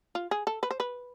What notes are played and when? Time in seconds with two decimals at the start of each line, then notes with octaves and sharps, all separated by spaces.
0.15 F4
0.31 G#4
0.47 A4
0.63 B4
0.71 C5
0.80 B4